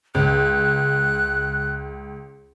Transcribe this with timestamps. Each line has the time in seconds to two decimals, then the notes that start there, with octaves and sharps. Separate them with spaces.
0.15 C#2 F#6